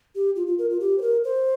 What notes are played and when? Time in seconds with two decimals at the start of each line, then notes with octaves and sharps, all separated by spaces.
0.15 G4
0.36 F4
0.47 F4
0.59 A#4
0.70 F4
0.80 G4
0.98 C5
1.02 A#4
1.24 C5